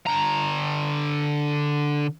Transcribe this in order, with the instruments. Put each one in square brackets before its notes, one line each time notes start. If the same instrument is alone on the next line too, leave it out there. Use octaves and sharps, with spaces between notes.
[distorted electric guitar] D3 A#5